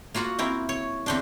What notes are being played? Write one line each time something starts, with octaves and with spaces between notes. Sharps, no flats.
A#3 F4 F#4 F#5
C4 E4 A#4
C#5
E2 C4 D4